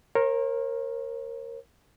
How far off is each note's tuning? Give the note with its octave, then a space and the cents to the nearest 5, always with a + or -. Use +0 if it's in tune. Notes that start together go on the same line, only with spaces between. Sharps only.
A#4 +0 C#5 -45